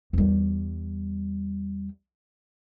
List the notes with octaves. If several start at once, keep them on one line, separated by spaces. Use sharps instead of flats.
E2 G3